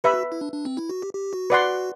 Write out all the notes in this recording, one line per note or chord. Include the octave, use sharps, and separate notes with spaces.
G4 B4 E5 B5
F#4
E4
D4
D4
C4
E4
F#4
G4
G4
F#4
B4 D5 F#5 C6